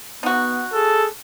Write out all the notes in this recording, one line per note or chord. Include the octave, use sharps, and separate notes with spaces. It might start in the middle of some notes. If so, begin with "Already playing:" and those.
B3 D#4 F#4
G#4 A4